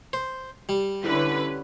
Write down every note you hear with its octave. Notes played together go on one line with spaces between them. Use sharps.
C5
G3
D3 C#4 E4 B4